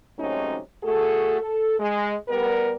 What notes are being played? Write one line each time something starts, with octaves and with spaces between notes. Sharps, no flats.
G#2 C3 F#3 A3 C#4 D#4
A3 F#4 G#4 A4
A4
G#3
G3 B3 A#4